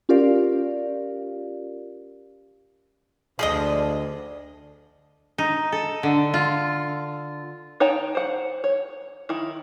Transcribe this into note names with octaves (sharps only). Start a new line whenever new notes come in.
C#4 F4 G4 A#4 D5 F5
D2 F3 G#3 D4 G#4 D#5
D#4
A4
D3
F4
D#4 C#5 G5 A5
C5 F#5
C#5
D#3 E4